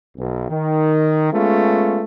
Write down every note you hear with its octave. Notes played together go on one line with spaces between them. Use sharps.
B1
D#3
G#3 A3 B3 C#4 F4